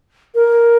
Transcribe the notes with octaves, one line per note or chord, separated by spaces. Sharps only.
A#4